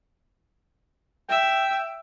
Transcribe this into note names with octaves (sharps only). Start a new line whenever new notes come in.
E5 G5